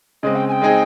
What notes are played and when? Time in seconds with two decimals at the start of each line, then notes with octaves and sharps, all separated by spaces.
0.23 C#3 G#3 C4 D#5
0.35 G5
0.48 G#5
0.52 G5
0.61 G#3 C4 D#4 G#4